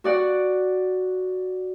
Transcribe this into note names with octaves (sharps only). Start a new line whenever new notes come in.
F#4 D5 F#5